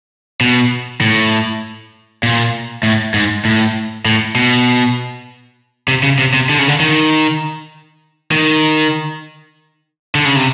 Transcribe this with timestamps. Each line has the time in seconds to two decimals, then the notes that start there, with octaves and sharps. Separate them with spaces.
0.41 B2
1.01 A2
2.23 A#2
2.83 A2
3.14 G#2
3.45 A2
4.05 A2
4.35 B2
5.88 C3
6.03 C#3
6.19 C3
6.34 C3
6.49 D3
6.59 C#3
6.68 D3
6.80 D#3
8.32 D#3
10.15 D3
10.25 C#3
10.36 C3